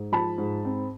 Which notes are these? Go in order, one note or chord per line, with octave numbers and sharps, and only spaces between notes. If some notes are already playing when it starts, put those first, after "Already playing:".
Already playing: G#2
F3 A5 B5
G#2
C4